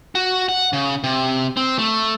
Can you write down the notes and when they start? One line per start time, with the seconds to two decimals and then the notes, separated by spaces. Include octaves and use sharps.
0.15 F#4
0.49 F#5
0.73 C#3
1.04 C3
1.57 C4
1.79 A3